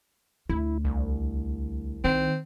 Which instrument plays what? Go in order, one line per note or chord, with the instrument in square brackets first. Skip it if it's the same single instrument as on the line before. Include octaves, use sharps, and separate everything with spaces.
[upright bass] D2 [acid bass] E4
[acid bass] C2
[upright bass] D#3 [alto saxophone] C4